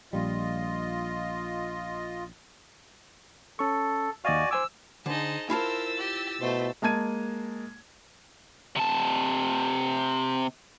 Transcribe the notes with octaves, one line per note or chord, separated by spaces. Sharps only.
A#1 G3 F4 D#5
C#4 A4 C#6
D#2 F#4 D5 D#5 F5 G#5
C5 G#5 D6 E6
D3 D#4 G#4 C5 G#5 A5
E4 F4 A#4 C5 A5 E6 A6 B6
G4
B2 A3 C5
G#3 A#3 A5 G#6 D#7
C3 A5